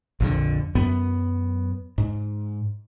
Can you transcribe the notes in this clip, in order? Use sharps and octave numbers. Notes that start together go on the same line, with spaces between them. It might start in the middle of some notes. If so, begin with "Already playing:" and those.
A#1 F2 D3
F#2 B3
G#2